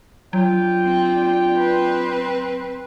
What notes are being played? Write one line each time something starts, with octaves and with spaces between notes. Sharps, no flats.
F#3 D4 F4 G5
C4
C4 B4